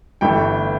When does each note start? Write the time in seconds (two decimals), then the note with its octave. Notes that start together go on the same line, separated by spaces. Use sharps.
0.21 G1 G2 E3 A3 G5